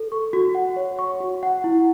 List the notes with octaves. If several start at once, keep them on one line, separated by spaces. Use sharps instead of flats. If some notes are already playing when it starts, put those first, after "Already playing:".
Already playing: A4
C#6
F#4
F#5
C#5
C#6
F#4
F#5
E4